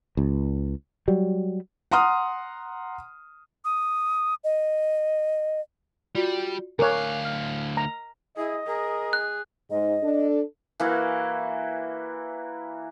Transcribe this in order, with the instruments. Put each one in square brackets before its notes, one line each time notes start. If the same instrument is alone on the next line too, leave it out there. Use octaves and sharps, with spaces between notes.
[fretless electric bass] C#2
F#3 G3
[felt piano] F#5 A#5 C6 D#6 F6
[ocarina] D#6
D#5
[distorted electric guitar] G3 [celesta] F4 F#4 D5
[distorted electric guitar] D2 F5 [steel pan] A#4 C#5 [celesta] G#5 D6 F#6
[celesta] F6
[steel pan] A#5
[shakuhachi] E4 [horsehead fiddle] G#4 [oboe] D#5
[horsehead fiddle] G#4 [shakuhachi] A#4
[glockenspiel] F#6
[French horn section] G#2 [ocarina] D#5
[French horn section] D4 A4
[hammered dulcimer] E3 A#3 E4 F#4